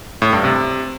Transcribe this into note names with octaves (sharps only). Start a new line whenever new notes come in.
A2
G2
C3